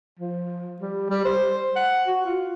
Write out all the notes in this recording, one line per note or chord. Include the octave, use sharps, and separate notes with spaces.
F3
G3
G3
C5
F#5
F#4
F4